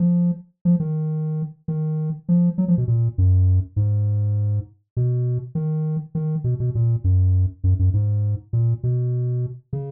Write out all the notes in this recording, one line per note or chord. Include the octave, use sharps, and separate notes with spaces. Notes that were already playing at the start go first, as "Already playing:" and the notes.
Already playing: F3
F3
D#3
D#3
F3
F#3
F3
B2
A#2
F#2
G#2
B2
D#3
D#3
B2
B2
A#2
F#2
F#2
F#2
G#2
A#2
B2
C#3